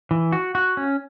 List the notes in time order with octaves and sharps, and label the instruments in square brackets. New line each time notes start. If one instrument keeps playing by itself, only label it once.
[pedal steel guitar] E3
F#4
F#4
C#4